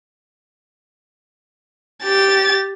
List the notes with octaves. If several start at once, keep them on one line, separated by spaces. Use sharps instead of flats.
G4 A6